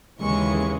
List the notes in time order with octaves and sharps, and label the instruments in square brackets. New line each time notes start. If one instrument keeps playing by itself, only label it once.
[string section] D#2 C#3 E3 G#3 C#6